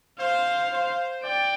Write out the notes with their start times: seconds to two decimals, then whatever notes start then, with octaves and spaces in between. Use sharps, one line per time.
0.20 C5 F5
0.72 C5
1.24 D5 G5